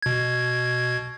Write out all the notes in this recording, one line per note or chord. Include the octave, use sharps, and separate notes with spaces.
B2 G#6